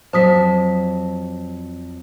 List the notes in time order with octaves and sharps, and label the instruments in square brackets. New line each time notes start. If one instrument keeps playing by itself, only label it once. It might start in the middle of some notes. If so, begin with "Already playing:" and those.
[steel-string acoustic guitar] F2 F#3 A5 [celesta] C5 D#6 B6